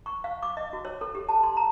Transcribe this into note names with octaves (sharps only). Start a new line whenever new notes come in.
C#6
F5
D6
D#5
F#4
C#5
A4
G4
A5
C6
A#5